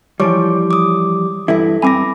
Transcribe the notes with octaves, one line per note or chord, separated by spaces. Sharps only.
E3 F3 G3 C#5 C#6 D6
D6 D#6
G2 E3 E4 A4 E5
G2 C4 G#5 B5 D6 A#6